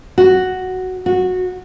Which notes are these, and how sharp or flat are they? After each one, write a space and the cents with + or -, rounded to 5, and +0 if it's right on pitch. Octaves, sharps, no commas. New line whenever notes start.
F#4 +5
F#4 -15